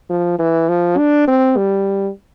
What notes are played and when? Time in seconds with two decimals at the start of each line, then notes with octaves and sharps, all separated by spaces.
0.10 F3
0.39 E3
0.69 F3
0.98 D4
1.27 C4
1.56 G3